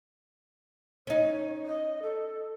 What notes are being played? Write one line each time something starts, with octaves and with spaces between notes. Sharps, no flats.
C#4 D#4 C#5
D#5
A4